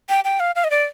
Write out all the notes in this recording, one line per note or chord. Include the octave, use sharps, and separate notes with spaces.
G5
G5
F5
F5
D#5
D5